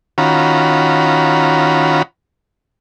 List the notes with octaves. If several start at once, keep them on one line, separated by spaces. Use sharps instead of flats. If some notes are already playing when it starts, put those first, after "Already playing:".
D#3 C#4 F4 F#4 A#5 B5